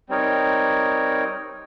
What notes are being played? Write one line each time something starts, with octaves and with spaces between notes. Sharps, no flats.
G3 C4 D#4 A#4 C#5